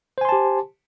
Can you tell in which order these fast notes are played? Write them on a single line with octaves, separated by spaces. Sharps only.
C5 G#5 C6 A5 G4